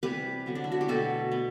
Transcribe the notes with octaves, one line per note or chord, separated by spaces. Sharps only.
C3 E3 G3 G4 B4
D3 F#3 B3
D4
E4
F#4
G4
B2 A3 F#4 A4
B3